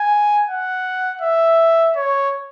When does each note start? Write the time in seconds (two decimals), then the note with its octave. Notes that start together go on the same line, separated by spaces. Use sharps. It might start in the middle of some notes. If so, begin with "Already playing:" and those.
Already playing: G#5
0.48 F#5
1.21 E5
1.96 C#5